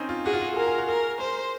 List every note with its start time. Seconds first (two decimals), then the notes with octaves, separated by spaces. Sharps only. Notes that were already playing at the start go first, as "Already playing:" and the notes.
Already playing: C4 C#4 D#4
0.09 F4
0.26 F#4 G#4
0.33 F4
0.41 F#4
0.56 G#4 A#4
0.67 G#4
0.78 F#4
0.88 G#4 A#4
1.20 A#4 C5